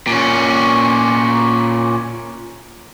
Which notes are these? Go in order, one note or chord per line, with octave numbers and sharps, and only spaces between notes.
A#2 C#4